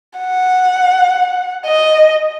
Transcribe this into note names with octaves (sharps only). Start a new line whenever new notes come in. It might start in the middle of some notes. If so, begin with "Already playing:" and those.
F#5
D#5